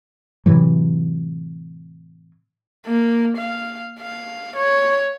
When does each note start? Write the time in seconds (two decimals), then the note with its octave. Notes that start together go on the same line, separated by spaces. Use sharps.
0.46 A2 C3 E3 F#3
2.86 A#3
3.37 F5
4.00 F5
4.56 C#5